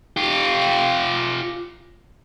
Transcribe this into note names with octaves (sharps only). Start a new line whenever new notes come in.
F4 G4